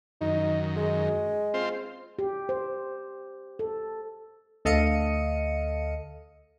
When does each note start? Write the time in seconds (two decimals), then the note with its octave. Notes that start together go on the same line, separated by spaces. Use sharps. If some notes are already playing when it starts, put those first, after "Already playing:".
0.21 F#2 D#3 D#4
0.76 G#3
1.54 C4 F4 C5
2.19 G4
2.49 C5
3.59 A4
4.65 D2 A4 D#5 F5 C#7 D#7